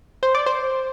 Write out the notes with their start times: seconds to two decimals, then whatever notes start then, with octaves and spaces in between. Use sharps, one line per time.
0.23 C5
0.35 D5
0.46 C5